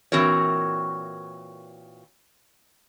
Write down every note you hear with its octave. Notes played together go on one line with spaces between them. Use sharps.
A#2 E3 C4 F#4 A#4 C#5